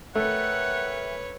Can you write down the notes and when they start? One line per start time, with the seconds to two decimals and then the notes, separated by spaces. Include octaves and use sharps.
0.15 A3 A#4 B4 C#5 E5 F#5 G5